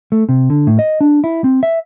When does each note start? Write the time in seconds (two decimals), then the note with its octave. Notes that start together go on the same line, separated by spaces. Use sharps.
0.12 A3
0.29 C3
0.50 D3
0.67 A2
0.79 D#5
1.01 D4
1.24 E4
1.44 C4
1.63 E5